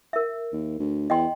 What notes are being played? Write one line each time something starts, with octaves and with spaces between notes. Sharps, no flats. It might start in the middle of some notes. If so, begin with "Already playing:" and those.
A#4 E5
D#2
D2
E2 D#5 G5 C6